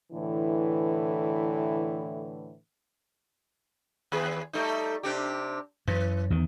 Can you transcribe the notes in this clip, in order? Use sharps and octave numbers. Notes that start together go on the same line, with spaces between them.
A2 D3 E3
D#2 B3 G#4
G3 A3 D#4
C3 D4 G4
F#2 E3
E2 D#3